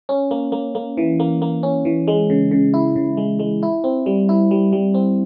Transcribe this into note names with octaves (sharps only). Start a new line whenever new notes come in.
C#4
A#3
A#3
A#3
E3
A#3
A#3
C#4
E3
G#3
C#3
C#3
E4
C#3
G#3
G#3
E4
C4
G3
E4
G3
G3
C4